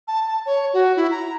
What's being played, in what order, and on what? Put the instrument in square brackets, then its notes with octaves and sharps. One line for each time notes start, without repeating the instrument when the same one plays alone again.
[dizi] A5
A5
C#5
F#4
E4
A#5